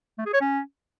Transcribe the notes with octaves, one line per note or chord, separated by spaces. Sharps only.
A3
G#4
C#5
C#4